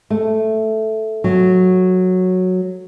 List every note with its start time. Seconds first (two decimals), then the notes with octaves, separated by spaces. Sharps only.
0.10 A3
1.24 F#3